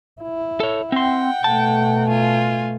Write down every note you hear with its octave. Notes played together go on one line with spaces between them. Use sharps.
E4
A4 C#5
C4 F#5 G5 C6
B2 A3 A5
F4 G#5